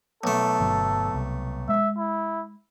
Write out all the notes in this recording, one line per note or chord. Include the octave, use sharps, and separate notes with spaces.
B1 A3 A4
G1 F#3
C2
G#3 E5
E4